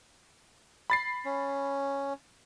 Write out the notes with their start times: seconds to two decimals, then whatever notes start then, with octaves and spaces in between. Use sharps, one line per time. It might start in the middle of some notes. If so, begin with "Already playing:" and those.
0.90 B5 A6 C7
1.25 C#4